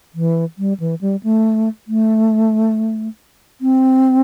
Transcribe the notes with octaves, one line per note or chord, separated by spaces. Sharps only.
E3
G3
E3
G3
A3
A3
C4